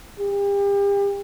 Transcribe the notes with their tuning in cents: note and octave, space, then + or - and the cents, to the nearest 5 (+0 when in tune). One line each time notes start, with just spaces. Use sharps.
G4 +40